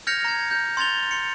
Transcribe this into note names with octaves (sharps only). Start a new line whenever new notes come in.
F6 G6 G#6 A#6 C#7 F7
A#5 G#6
G6
C6 G#6 A6 F7 G7
C6 C#7